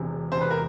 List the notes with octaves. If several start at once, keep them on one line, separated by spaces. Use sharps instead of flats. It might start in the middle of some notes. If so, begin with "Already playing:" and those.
Already playing: E1 E2 C3
E1 E2 C3 C5
B4
A#4